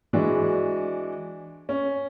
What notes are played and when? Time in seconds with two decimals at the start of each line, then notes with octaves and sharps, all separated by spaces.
0.13 E3 G#3 D4 F#4
1.69 C#4